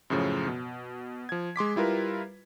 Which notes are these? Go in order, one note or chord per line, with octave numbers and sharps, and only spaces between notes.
F#2 A2 C#3 F3
B2
F3 G#6
G#3 C6 D6 B6
G3 E4 F4 A#4 B4